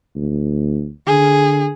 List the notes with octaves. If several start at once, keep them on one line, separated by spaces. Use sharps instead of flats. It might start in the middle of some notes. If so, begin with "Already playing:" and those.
D2
D3 G#4